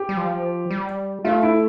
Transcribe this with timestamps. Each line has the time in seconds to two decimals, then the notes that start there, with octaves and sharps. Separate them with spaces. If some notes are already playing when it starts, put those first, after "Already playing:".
Already playing: G4
0.09 G3
0.17 F3
0.70 G3
1.24 A3 F4
1.43 E4